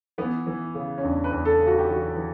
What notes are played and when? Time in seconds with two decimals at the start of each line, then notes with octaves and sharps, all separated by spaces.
0.18 E3 B3
0.47 E3
0.75 C#3
0.98 C#4
1.03 E2 D4
1.24 B4
1.32 E2
1.45 A4
1.60 C#3
1.67 F#4
1.78 G4
1.89 E3 F#4
2.16 E3